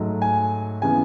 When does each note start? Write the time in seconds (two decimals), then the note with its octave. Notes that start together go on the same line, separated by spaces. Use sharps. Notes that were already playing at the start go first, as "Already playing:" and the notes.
Already playing: G#2 F#3 A3
0.22 G#5
0.82 C#3 E3 B3 G#5